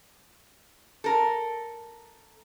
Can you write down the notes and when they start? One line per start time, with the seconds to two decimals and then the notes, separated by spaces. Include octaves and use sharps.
1.04 A4 A#4